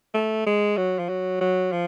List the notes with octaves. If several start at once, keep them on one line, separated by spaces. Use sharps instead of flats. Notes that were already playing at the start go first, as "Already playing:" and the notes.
A3
G#3
F#3
F3
F#3
F#3
F3